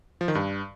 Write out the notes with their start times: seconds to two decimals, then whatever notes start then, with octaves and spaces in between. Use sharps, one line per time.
0.21 F3
0.28 D#3
0.35 G2